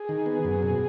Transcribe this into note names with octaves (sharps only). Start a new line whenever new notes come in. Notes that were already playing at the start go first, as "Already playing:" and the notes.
Already playing: G#4
D#3
B3
F#2
B2